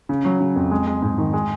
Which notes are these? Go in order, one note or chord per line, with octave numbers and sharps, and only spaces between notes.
C#3
F#3
C#3
F2
G#3
G#3
G#2
D#3
G#3